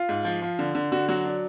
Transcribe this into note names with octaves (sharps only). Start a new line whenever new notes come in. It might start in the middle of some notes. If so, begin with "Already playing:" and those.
Already playing: F4
G#2
F3
F3
D3
D3
D3 F#4
F#3 F#4
D4